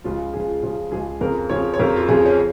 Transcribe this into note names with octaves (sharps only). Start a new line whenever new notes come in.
C#2 C#3 F3 F4
C#2 C#3 F3 G#4
C#2 C#3 F3
C#2 C#3 F3 G#4
F2 C#3 F3 A#4
F2 C#3 F3 C#5
C#5
F2 C#3 F3 A#4
F4
F2 C#3 F3 G#4
C#4